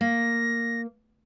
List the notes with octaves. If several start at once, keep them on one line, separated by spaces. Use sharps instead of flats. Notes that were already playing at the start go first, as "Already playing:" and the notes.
A#3 A#6